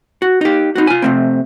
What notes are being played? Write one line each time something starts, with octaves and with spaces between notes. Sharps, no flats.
F#4
D#4 G4
D#4 F#4
F4 G#5
C3 A3 C4